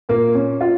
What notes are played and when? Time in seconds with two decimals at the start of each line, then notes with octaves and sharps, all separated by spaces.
0.09 A#2 A#3
0.34 C#4
0.61 F4